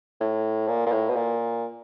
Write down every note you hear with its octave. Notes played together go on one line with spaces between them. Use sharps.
A2
A#2
A#2
A2
B2
A#2